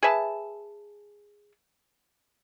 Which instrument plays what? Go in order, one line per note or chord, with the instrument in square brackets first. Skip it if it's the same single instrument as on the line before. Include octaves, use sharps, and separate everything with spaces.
[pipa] G#4 B4 E5 A5